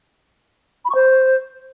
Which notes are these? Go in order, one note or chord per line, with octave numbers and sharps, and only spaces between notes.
B5
C#6
C5